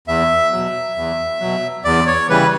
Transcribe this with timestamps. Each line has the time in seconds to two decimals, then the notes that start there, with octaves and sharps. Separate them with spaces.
0.08 E2 E5
0.52 B2 F#3
0.96 E2
1.40 B2 F#3
1.84 E2 D5
2.07 C#5
2.29 C#3 E3 G3 B4